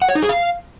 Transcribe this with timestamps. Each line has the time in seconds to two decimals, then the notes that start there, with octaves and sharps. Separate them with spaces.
0.02 F#5
0.09 C#5
0.15 D#4
0.22 G#4
0.29 F5